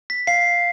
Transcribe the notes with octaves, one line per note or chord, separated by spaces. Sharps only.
B6
F5 C7